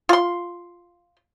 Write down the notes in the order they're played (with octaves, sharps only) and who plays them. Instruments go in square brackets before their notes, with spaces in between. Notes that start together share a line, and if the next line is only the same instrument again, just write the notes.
[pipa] F4 C6